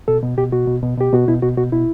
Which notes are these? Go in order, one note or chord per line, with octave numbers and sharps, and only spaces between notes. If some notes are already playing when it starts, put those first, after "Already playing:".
B2 A4
B2
B2 G4
B2 F#4
B2
B2
B2 G4
B2 F#4
B2 E4
B2 F#4
B2 F#4
B2 E4